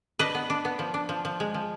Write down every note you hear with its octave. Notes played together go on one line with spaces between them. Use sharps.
D4 B4 D#5
B3
D4
B3
F3
D4
F3
F3
G#3
F3